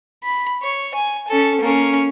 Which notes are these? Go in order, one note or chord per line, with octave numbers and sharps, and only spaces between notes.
B5
C#5
G#5
C#4 A4
A#3 C#4